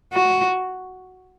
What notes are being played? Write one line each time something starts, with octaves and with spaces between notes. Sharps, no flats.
F#4